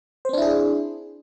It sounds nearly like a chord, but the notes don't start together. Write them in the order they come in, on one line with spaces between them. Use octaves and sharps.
C5 C4 D4 E4 G#4